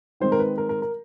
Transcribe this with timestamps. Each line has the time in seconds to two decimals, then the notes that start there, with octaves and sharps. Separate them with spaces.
0.20 D#3 G#3 C4 C5
0.32 A#4
0.39 B4
0.58 A#4
0.69 A#4
0.82 A#4